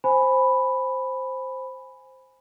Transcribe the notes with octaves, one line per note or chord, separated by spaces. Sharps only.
C5 G#5 B5